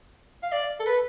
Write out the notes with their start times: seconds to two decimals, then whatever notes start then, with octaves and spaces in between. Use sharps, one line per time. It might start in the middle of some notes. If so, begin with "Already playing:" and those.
0.43 F5
0.52 D5
0.80 A4
0.87 B4